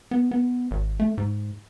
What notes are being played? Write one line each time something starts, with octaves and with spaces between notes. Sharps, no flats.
B3
B3
G#1
A3
G#2